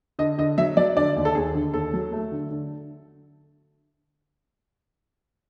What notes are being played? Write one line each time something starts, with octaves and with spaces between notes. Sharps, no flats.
D3 D#5
D3 D#5
F#3 E5
F#3 D5
D3 D5
D#2
A4
D#2 G#4
D3
D#2 A4
F#3
A3
D3
D3